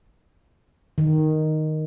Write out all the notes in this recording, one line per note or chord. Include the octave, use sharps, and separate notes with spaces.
D#3